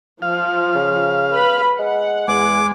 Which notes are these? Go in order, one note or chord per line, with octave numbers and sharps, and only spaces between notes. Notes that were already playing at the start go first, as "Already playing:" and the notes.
F3 F5
C#3
B4 B5
G#3 F#5
E2 G#3 D6